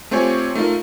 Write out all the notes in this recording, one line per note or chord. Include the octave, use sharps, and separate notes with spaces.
A3 C4 F4 G4 C#5 G#5
A3 D#4 F4 A#4